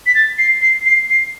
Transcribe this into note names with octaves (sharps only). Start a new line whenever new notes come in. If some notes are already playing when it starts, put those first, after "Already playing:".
B6
A6
C7
C7
C7
C7